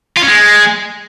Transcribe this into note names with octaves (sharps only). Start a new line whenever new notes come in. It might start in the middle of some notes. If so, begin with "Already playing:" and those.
F4
C#4
G#3